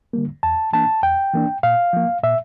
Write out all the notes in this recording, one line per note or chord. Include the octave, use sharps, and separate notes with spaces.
D3 G3 A#3
E2 A5
E3 A#3 D4 A5
E2 G5
E3 A#3 D4
A#2 F5
F3 A#3
A#2 E5